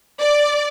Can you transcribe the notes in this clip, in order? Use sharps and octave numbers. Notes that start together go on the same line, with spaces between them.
D5